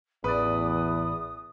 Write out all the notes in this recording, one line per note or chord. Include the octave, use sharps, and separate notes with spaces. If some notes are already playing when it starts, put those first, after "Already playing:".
A1 E2 B4 D5 D#6